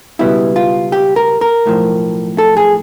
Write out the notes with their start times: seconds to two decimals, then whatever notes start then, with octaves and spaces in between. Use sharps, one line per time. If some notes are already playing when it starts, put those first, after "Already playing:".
0.19 C#2 B2 G3 B3 E4
0.56 F4
0.92 G4
1.16 A#4
1.41 A#4
1.66 B1 A2 F3
2.38 A4
2.57 G#4